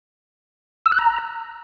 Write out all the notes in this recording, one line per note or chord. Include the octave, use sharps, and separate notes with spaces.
E6
F#6
A#5